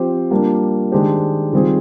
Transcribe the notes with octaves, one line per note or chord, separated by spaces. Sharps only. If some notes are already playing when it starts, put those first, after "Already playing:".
Already playing: F3 C4 G4 C5
G3 A#3 D4 F4
D#3 G#3 D4 G4 C5
D#3 G3 C4 F4 G#4